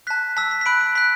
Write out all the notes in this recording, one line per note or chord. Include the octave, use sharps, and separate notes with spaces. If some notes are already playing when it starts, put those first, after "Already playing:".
A5 F#6 B6
A5 E6 B6
B6
B6
B5 F#6 D7
D7
B5 F#6 B6